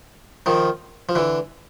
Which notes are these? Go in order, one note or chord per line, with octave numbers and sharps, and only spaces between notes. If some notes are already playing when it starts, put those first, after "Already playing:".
D#3 F3
F3
D3 E3